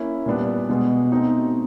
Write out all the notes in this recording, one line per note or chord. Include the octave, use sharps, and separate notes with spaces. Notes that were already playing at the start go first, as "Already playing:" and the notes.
Already playing: A#3 C#4 E4
A#2 G3 B3 D4
B2 G#3 B3
A3 C4 D#4 F#4